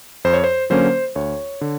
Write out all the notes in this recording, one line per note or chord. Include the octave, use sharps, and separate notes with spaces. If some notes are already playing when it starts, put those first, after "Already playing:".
F2 C5
C#5
C5
D3 F#3 A#3 C#4 C5
D2 C#5
D3